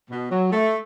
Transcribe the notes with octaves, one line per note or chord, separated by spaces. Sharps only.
B2
F#3
A3